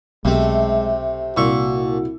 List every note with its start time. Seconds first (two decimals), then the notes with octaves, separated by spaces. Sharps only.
0.25 B1 C3 G#3 A3
1.37 C2 A#2 F#4 C#6 E6